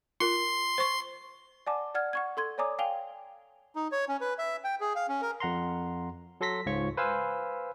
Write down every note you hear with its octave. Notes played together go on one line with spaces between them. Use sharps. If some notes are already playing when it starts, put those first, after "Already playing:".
F4 A#4 C6
C5 C#6
D5 F#5 G#5 A5 D6
D5 F#5 F6 G#6
F#5 C#6 G#6
A4 C6 G#6
C#5 D5 G#5 A#5 D6 D#6
F5 G5 G#5 F7 G7
D#4
C#5
C#4
B4
E5
G5
G#4
F5
C#4
A#4
F2 F#5 A#5 C6
F#3 A4 C6 A#6 B6
C#2 G#2 F4 C#5 C#6
B4 C5 F5 G#5 E6